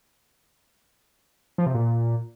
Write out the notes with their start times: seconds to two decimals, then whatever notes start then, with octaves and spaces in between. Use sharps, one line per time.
1.58 F3
1.66 C3
1.74 A#2